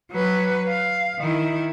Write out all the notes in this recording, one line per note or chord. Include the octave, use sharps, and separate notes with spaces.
F#3 B4
F5
D#3 E4